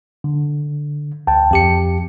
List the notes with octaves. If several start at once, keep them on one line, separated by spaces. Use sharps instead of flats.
D3
D2 G5 A5
F2 G4 C#7